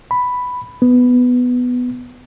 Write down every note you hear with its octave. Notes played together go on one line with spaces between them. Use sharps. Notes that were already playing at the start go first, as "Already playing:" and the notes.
B5
B3